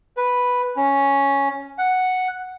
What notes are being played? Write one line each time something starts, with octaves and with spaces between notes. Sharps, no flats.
B4
C#4
F#5